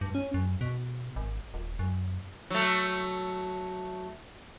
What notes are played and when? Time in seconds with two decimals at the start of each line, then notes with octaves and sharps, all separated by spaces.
0.01 G2
0.15 C#4
0.34 F#2
0.61 B2
1.16 G#1
1.54 D#1
1.79 F#2
2.50 F#3 A3